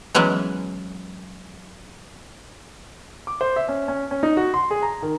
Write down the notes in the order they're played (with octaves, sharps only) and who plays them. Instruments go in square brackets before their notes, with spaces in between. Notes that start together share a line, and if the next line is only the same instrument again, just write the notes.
[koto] E3 F#3 G#3 B3 C#4
[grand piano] D6
C5
E5
C#4
C#4
C#4
D#4
F#4
C6
G#4
A#5
D#3